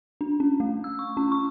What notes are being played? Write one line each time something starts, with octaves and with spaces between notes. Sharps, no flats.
D4
C#4
A3
E6
C#6
C#4
C#6